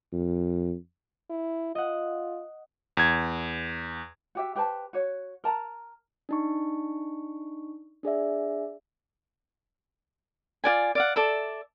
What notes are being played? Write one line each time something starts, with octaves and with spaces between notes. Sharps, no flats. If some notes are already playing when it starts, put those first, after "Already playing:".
F2
E4
F4 D#5 F#5
E2 G#6
F#4 G4 E5
G4 B4 C5 A5
F#4 C#5
A#4 A5 A#5
D4 D#4 C#6
D4 G#4 D5 E5
F4 F#4 D5 G#5
D5 F5 F#5
A4 D5 E5